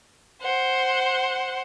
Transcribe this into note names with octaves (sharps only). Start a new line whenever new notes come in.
C5 F#5